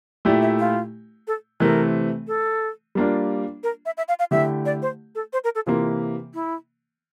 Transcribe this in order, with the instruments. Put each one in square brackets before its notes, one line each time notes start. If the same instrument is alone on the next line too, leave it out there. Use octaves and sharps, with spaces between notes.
[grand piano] A#2 A3 E4 G4 [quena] D5
[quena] E5
F4
A4
[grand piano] C3 E3 A3 C4 [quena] A#4
[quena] A4
[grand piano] G3 A#3 D4 F4
[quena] A#4
E5
E5
F5
F5
[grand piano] D3 A3 E4 G4 [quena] E5
[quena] D5
C5
A4
C5
A#4
A4
[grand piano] C3 E3 A#3 [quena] F4
[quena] E4